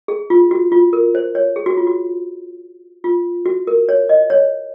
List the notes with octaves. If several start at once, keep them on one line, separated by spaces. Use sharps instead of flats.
G#4
F4
F#4
F4
A#4
C5
C#5
G#4
F#4
F4
F#4
F4
F#4
A#4
C#5
D#5
C#5